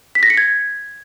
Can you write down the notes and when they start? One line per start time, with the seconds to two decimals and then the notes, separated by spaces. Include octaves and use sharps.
0.15 B6
0.23 A#6
0.30 C#7
0.37 G#6